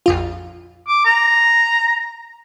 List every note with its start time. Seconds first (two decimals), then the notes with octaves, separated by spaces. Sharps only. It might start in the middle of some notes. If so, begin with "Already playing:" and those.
0.06 A#1 F2 F4
0.88 D6
1.06 A#5